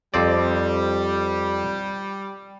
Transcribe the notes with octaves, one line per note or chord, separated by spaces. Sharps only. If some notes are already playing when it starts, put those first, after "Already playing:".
F2 G3 C4 D5